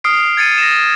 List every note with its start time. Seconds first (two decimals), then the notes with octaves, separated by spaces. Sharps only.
0.04 D#6 F6 C7 D7
0.37 G#6 A6 C#7 D#7
0.58 A#6 E7